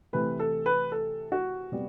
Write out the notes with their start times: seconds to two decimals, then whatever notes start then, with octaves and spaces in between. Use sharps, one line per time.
0.13 C3 E3 A3 B4
0.40 A4
0.66 B4
0.92 A4
1.32 F#4
1.72 C3 G3 B3